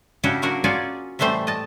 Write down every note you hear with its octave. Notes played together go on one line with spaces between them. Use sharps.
C#3 C#4 D4 E4 F#4 G4
F#3 A#3 D4 F#4 A#4
C#4 F4 F#4 G#4 D5
A2 E3 G3 A3 C5
D#5 A5